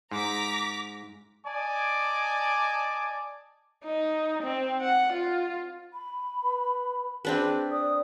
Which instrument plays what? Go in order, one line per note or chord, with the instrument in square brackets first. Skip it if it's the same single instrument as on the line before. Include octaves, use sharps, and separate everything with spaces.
[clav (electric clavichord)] G#2 [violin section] A#5 D6 B6
[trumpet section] D5 D#5 G#5 A5 D6
[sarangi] D#4
C4
F#5
F4
[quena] B5
[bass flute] B4
[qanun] C4 D4 B4 [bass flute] G#4
[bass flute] D5 [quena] D#6